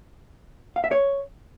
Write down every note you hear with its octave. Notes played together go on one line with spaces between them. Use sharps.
F5
E5
C#5